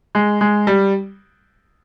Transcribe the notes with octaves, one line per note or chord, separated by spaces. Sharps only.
G#3
G#3
G3